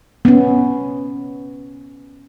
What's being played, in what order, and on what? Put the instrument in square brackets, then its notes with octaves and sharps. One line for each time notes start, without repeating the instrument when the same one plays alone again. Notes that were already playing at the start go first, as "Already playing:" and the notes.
[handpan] B3 C#4